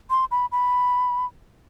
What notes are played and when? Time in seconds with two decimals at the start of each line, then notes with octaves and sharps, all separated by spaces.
0.10 C6
0.31 B5
0.52 B5